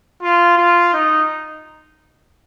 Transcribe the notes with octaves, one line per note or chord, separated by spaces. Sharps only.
F4
F4
D#4